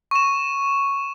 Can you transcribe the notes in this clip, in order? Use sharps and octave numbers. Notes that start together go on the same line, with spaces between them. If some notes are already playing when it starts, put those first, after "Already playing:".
C#6 E7